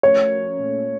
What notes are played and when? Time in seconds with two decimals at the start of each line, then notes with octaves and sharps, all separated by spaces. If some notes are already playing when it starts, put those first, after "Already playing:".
0.03 F3 A3 C#4 F#4 A#4 C#5
0.58 A#2 A3 C#4